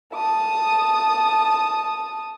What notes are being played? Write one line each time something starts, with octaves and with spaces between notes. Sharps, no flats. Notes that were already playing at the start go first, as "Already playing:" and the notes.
A5 D#6